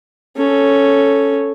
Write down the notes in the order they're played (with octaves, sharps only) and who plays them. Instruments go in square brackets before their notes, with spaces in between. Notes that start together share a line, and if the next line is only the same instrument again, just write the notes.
[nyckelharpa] C#4 A4